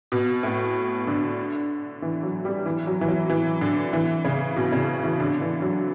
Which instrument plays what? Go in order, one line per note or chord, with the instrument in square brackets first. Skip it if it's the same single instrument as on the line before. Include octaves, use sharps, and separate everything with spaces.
[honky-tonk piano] B2
A2
D3
E3
F#3
G3
E3
F#3
E3
F#3
E3
D3
E3
C#3
B2
C#3
E3
D3
E3
F#3